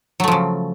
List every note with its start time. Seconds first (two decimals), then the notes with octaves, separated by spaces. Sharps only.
0.20 F#3
0.24 A3
0.28 F3
0.32 C#3